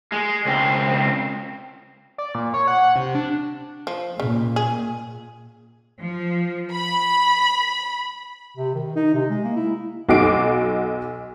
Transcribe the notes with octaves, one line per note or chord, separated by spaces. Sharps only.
G#3
C#2 C4
D5
A#2
C#5
F#5
C3
D4
F3
A#2 C#3
G#4
F3
B5
C3
D#3
D#4
C3
G#3
A#3
E4
B1 D#4 F#4 D6 C7 D7